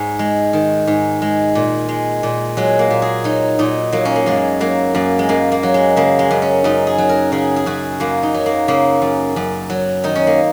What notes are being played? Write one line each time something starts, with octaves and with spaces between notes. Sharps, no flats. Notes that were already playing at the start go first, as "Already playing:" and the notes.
Already playing: G#2
G#3
D#3
G#2
G#3
A#2
G#3
A#2
F#3 G#3
A#3
A#2
G#4
F#3 D#4
A#2 D#4
F#3 A#3
C#4
A#3
F#2 G#3
F#3 A#3
F#2 A#3
G#3
F#2 A#3
A#3
F#3
G#3
C#3 A#3
G#3
F#2
C#4
F#2 D#4
G#4
F#3
A#4
C#3 G#4
G#4
F#2 F#4
F#2 A#3
D#4
F#3
A#3
C#3 A#3
F#2
F#2
F#3
D#3 D#4
C#4
A#3